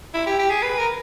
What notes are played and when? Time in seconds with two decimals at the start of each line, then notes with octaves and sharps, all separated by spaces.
0.14 E4
0.27 G4
0.39 G4
0.50 G#4
0.63 B4
0.78 A#4